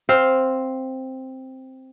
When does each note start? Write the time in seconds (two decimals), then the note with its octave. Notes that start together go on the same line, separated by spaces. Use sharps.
0.09 C4 C5 F5